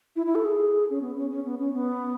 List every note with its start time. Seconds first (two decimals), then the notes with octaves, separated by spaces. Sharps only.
0.16 E4
0.26 E4
0.35 A4
0.45 G#4
0.90 C#4
1.01 B3
1.16 C#4
1.30 C#4
1.45 B3
1.59 C#4
1.74 B3